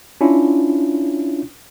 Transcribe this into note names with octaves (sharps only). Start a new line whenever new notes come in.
C#4 D4 E4 F4